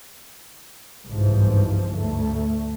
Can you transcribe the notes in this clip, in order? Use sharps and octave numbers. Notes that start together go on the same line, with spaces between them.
G1 C2 G#2 E3 F3
D2 A3